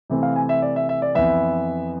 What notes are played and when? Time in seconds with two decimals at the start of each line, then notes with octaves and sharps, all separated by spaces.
0.10 C3 E3 A3 C4
0.23 F5
0.36 G#5
0.49 E5
0.62 D5
0.76 E5
0.89 E5
1.02 D5
1.15 F2 E3 B3 E5